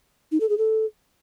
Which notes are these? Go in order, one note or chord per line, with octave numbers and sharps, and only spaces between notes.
D#4
A4
G#4
A4